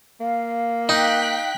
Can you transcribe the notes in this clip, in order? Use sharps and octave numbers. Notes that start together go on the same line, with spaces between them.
A#3 F5
D#4 G5 F#6 B6